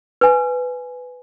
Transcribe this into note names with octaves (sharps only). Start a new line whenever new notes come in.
B4 G#5